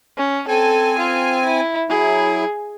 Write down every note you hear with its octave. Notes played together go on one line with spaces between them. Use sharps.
C#4
C4 A4 G#5
F4
E4
F#3 E4 G#4